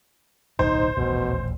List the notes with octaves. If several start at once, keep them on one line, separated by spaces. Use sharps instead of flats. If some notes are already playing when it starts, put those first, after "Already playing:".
D1 B1 G#2 D#4 C5
D#1 A1 D2 B2